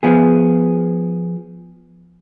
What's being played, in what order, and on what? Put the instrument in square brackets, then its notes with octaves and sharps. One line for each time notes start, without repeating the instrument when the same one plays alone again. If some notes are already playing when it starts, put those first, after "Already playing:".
[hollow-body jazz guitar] F3 B3 G#4